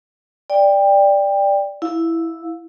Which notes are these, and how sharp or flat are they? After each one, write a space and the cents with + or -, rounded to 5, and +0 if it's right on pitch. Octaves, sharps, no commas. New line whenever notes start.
D5 +0 G5 +20
E4 +0 F5 +20